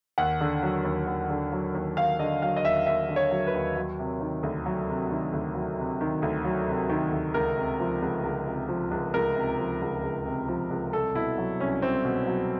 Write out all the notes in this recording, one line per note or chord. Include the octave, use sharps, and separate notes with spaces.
D#2 F#5
D3
F#3
D#2
D#2
D3
F#3
D#2
D#2 F5
D3 D#5
F#3 F5
D#5
D#2 E5
D#2 E5
D3
C#5
F#3
B4
D#2
F#3
C3
D#3
D2
F#3
C3
D#3
D2
F#3
C3
D#3
D2
F#3
C3
D#3
D2
C#2 A#4
C3
F3
C#2
C#2
C3
F3
C#2
C#2 A#4
C3
F3
C#2
C#2
C3
F3
C#2
C2 A4
B2 E4
F#3
C2 C#4
C2 C4
B2
F#3